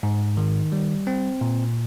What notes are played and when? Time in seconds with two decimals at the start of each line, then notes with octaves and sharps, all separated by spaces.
0.03 G#2
0.37 D#3
0.72 G3
1.07 C4
1.41 A#2